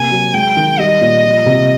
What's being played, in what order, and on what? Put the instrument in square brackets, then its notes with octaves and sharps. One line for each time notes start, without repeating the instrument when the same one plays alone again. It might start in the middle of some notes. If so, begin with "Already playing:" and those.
Already playing: [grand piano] C3 A#3 [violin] G#5
[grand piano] F#3
[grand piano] G#3 [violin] G5
[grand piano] D#3
[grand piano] G3 [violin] D#5
[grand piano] A#2
F3
C3